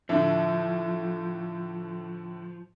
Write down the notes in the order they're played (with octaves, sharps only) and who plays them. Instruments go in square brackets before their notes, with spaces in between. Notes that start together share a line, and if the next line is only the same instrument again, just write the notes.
[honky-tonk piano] A2 D3 [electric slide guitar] F3 [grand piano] E5